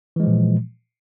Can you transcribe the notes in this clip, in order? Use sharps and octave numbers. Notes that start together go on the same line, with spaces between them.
A#2 E3 F3 G#3